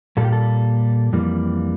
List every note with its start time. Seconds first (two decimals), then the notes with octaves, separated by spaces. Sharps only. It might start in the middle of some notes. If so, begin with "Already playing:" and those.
0.17 A#2 G3 A#3 A4
0.25 G4
0.32 A4
1.13 F2 E3 G3 A#3